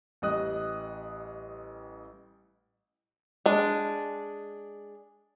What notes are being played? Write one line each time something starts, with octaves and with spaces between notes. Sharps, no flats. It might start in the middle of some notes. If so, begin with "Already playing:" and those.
A1 G3 D#5 D#6 F#6
G#3 D4